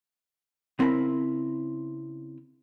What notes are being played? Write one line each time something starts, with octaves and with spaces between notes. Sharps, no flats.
C#3 C4 E4 A#4 F5 B5